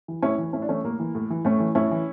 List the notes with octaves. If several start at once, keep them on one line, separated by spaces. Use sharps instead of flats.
E3
A2 C#4 E4
E3
A2 C#4 E4
D4
E3 A3 C#4
A2 A#3
E3
A2
E3
A2 A3 C#4
E3
A2 C#4 E4
E3